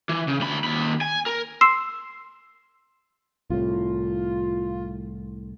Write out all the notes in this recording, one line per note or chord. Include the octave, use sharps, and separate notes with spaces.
E3
C#3
D2 B5
D#2 B5
G#5
A#4
C6 E6 C7 E7
C2 A2 F4